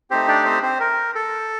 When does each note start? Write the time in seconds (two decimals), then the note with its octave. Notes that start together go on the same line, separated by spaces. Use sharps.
0.11 A3 C4 D#4 G4 C5
0.28 D4 D5
0.45 C4 C5
0.62 C4 C5
0.80 A#4
1.15 A4